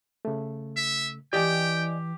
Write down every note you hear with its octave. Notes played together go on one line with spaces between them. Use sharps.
C#3 A3
E5
E3 G4 D5 D#5 G5 G#5